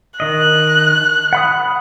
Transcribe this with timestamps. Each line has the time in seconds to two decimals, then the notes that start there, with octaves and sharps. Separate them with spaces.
0.20 D#3 D#5 F#6
1.33 F#5 B5 D#6